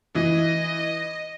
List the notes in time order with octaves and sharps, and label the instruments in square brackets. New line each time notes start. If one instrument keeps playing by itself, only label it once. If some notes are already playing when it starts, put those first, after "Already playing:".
[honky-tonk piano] E3 [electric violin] D#5